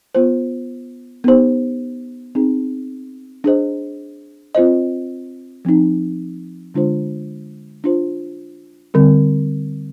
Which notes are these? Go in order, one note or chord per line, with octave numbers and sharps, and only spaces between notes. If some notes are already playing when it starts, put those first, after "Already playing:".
B3 F4 C5
B3 D#4 G4 C5
C4 D#4 G#4
D4 G#4 C5 D#5
C4 F4 C5 D#5
F3 C4 D#4
D3 G#3 D4 F4 C5
D4 F4 C5
D3 G3 C4